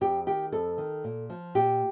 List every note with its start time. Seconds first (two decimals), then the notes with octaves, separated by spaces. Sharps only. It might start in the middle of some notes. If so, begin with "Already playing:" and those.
0.01 F2 G4
0.26 D#3 G4
0.52 F2 A4
0.78 D#3
1.04 A#2
1.30 F3
1.55 A#2 G4